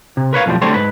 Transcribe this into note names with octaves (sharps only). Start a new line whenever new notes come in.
C3
A#4 B4 C#5 F5
B1 F2 A2 F3 G3
D3 G3 A3 C4 C5 C#5
G#2 B4